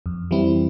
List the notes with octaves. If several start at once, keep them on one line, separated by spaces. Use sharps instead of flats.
F2
E3 G3 C4 E4